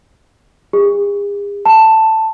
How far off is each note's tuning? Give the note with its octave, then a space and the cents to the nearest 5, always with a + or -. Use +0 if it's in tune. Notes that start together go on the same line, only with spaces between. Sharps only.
G#4 -45
A5 +5